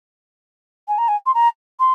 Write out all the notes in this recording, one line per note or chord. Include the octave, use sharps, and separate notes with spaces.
G#5
A#5
G#5
C6
A#5
C6